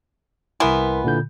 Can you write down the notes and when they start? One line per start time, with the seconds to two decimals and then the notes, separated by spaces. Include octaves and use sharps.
0.60 C2 E3 B3 A#4 C6
1.04 A#2 D3 G6